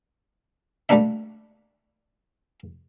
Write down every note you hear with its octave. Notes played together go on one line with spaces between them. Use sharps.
G3 A3 A#3 D4 E5